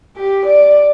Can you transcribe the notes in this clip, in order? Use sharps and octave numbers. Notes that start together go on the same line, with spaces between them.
G4
D5